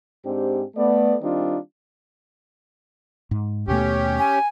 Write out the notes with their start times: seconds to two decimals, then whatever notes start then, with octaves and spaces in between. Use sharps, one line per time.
0.25 G#2 C4 D4 G4
0.76 A3 B3 D5
1.22 D#3 G3 C4 D4 D#4 F4
3.31 G#2
3.68 D#2 B2 A3 C#4 G4
4.18 G#5